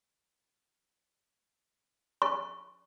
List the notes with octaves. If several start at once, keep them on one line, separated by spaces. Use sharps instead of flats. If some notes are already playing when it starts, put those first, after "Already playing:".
C#6